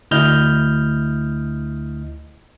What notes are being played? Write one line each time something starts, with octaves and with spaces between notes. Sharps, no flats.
D2 E4 D#5 F6 G6